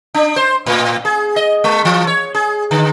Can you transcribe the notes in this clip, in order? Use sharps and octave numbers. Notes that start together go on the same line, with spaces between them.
D4
C5
A2
G#4
D#5
G#3
E3
C#5
G#4
D3